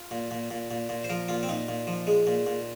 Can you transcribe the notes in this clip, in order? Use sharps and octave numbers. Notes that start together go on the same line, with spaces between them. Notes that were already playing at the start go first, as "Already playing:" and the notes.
Already playing: F4
A#2
A#2
A#2
A#2
A#2
C5
F3 A#4
A#2 F4
C4
A#2 D#4
A#2
F3
G#3
A#2
A#2